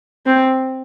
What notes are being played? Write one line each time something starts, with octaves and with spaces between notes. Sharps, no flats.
C4